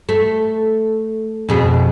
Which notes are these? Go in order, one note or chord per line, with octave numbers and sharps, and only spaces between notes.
A3
F2 B2 G#4